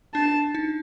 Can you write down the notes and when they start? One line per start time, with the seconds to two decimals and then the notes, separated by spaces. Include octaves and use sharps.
0.14 D4 A5
0.55 D#4